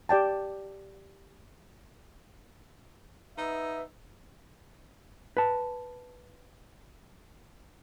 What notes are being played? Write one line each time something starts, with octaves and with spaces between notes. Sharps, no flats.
G4 D5 G5 A5
B3 D#4 B4 E5
B4 A5